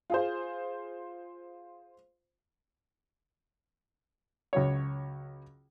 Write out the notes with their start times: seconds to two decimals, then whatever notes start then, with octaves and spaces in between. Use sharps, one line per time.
0.10 F4 G#4 C5
4.53 C#2 F#3 C#5